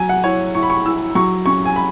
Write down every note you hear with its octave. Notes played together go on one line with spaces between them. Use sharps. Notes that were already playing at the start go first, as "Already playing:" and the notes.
Already playing: F#3 G#5
F#5
E4 C#5
E4 C#6
B5
C#6
E4 E6
F#3 C#6
C#4 C#6
G#5
B5